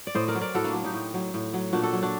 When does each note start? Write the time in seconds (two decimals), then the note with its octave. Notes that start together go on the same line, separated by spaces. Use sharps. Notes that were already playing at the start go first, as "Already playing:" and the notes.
0.07 D5
0.15 A2 C5 D#5
0.28 A#4 D5
0.35 F#3
0.41 A#4 D5
0.54 A2 F#4 A4
0.64 A#3 D4
0.74 F#3
0.84 D#4 G4
0.94 A2
1.14 F#3
1.34 A2
1.54 F#3
1.73 A#2 D4 F#4
1.83 F#4 A4
1.93 F#3
2.02 D4 F#4